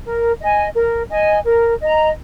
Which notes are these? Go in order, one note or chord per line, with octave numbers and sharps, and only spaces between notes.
A#4
D#5 G#5
A#4
D#5 G#5
A#4
D#5 A#5